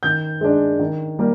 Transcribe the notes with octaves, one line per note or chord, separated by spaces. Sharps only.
D#3 G6
G#3 D4
D#3
G3 A#3